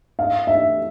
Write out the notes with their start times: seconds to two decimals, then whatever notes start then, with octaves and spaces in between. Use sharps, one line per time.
0.19 F5
0.47 E5